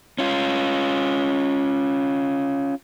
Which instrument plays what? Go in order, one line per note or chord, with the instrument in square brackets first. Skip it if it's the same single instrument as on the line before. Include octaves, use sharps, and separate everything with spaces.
[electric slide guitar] C#4 F4